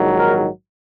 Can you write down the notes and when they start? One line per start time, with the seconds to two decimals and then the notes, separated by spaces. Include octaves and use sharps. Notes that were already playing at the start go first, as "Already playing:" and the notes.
Already playing: A#1 G#2 D#3 F#3
0.17 A#4